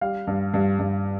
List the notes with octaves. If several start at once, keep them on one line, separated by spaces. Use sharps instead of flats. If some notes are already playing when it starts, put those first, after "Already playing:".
G3 F5
G2
G2
G2